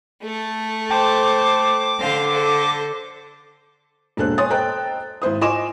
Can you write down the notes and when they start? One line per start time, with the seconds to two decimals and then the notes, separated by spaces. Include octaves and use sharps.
0.23 A3 A4
0.91 C5 G5 A5 D6
2.00 D3 C5 F5
2.33 A4 C5
4.17 E1 A#3 D4 A4 C5 F#6
4.38 C#5 G#5 C6 D#6 A6
4.50 A4 C5 D#5 G5 A#5 F#6
5.22 G#1 E4 C5 D#6
5.41 F4 D#5 G#5 C6 D6 E7